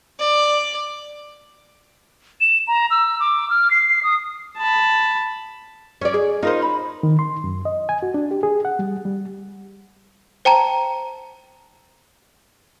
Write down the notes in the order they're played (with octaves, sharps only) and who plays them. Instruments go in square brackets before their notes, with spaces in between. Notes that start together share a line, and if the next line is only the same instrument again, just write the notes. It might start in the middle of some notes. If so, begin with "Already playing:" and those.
[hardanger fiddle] D5
[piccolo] E7
A#5
E6
D6
F6
C7
D#6
[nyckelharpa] A5 B5
[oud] C#4 D5
G#4
[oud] D#4 [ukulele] F4 A#4 C5
[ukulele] B5
[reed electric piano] D#3
C6
F#2
D#5
G#5
F#4
D4
G4
G#4
F#5
G3
G3
[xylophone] C5 G5 A5 A#5